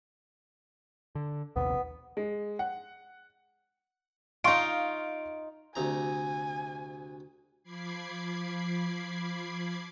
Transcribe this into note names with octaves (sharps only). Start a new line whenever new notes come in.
D3
A#1 D#2 C3 B3
G#3
F#5
D#4 F4 F5 C6 C#6 D7
D2 C3 G#5 A#5
F3 B5 D6 G#6 C7